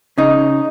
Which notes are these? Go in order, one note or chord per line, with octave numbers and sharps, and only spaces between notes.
C#3 D#4